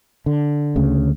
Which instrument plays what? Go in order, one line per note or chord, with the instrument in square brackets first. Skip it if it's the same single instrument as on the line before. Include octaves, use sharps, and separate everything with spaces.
[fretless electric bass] D3
D2 C#3